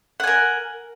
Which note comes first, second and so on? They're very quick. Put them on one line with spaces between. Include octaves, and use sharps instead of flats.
F#5 G#5 A#4